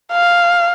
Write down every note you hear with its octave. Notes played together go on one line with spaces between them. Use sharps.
F5